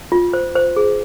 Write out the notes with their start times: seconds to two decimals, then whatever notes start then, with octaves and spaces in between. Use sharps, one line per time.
0.12 F4
0.33 C5
0.56 C5
0.76 G#4